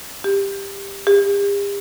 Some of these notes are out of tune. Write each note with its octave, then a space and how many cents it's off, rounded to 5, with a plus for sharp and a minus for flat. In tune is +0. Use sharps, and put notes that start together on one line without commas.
G4 +15
G4 +45